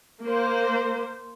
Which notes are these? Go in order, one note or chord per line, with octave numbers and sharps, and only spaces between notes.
A#3 C5